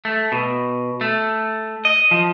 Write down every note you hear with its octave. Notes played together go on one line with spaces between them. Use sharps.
A3
B2
A3
D#5
F3